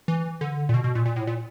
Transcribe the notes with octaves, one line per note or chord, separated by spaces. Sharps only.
E3
D3
A#2
B2
B2
A#2
A#2
A2
A#2